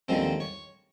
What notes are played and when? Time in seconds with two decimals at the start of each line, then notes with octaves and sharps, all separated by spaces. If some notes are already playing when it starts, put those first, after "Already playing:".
0.09 D#2 D3 F3 G#3 C4 C5
0.40 C#5